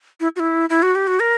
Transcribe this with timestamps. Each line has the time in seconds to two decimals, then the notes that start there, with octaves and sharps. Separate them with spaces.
0.20 E4
0.36 F#4
0.40 E4
0.70 E4
0.82 F#4
0.95 G4
1.07 F#4
1.20 A#4